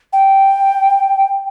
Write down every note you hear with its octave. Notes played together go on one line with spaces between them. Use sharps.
G5